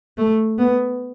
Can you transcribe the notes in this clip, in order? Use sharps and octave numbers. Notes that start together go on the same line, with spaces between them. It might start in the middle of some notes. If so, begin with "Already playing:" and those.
A3
B3